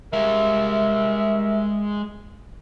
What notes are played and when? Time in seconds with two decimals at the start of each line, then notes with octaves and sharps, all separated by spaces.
0.13 G3 G#3 A#4 E5 F5